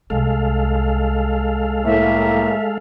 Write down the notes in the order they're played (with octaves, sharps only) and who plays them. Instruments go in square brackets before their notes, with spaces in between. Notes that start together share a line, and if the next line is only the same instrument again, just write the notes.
[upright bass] C2 [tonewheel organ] G#3 A4 F5
[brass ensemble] A2 A#3 [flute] E5